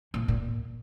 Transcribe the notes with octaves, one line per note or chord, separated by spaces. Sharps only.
A#2
A#2